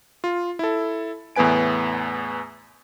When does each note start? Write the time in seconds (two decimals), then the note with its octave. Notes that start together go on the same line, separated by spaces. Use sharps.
0.24 F4
0.59 E4 A4
1.36 E2 A2 B3 B4 G#5 D7